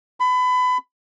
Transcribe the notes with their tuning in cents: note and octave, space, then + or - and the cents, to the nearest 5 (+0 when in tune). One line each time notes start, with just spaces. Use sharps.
B5 +25